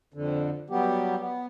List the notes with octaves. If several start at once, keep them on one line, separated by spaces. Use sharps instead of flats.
F2 D3
F#3 G3 B3 G4
B3